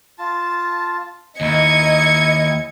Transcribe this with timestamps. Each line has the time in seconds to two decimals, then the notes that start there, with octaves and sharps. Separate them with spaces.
0.18 F4 A5
1.41 D#2 E4 D#5 G#6 C#7